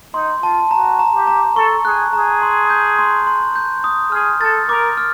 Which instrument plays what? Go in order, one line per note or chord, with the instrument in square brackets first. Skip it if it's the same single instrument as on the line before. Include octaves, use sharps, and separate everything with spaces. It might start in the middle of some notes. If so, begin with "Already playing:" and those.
[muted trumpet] D#4 [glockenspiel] C6
[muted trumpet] F4 [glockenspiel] A5
[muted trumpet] F#4 [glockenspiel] A#5
[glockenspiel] A#5
[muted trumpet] G4
[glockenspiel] A#5
[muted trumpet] A4 [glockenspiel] C#6
[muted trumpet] G#4 [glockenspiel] F#6
[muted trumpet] G#4 [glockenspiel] A#5
[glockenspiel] C6
G6
C6
C6
G6
D#6
[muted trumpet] G#4 [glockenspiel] F6
[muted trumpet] A4 [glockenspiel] A6
[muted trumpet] A#4 [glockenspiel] D6
[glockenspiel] F6